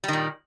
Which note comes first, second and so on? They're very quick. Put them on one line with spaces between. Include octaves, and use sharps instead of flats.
G3 D#3 A#2